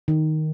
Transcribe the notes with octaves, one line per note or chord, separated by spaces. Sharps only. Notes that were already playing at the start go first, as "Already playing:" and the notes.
D#3